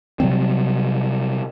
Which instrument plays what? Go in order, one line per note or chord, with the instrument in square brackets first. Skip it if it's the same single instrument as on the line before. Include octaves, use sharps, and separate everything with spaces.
[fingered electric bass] C3 F#3 G3 C4